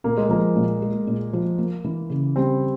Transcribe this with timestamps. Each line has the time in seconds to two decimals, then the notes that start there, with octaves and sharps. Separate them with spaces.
0.04 A#2 A#3
0.17 G#3
0.29 F3 A#3
0.56 A#2
0.82 G#3
1.07 A#2
1.33 F3
1.58 A#3
1.84 E3
2.10 C#3
2.36 G3 C4